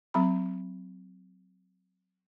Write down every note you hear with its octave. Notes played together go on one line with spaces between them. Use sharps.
F#3 C4 B5